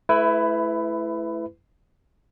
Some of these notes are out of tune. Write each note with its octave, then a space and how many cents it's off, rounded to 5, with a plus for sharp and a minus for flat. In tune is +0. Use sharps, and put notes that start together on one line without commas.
A3 -25 E4 +10 B4 +20